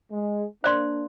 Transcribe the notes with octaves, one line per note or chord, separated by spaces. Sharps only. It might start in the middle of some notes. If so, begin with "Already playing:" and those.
G#3
A#3 D4 C5 D5 C6